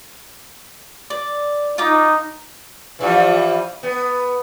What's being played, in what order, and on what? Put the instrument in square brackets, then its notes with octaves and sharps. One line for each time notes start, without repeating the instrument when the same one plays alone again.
[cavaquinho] D5
[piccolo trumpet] D#4 [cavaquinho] F4 D6
[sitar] E3 F3 G3
B3